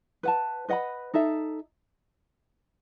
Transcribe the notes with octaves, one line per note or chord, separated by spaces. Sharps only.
B4 F#5 A5
B4 D#5 F#5 B5
D#4 A4 E5